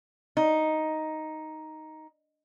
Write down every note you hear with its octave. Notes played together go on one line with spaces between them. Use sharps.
D#4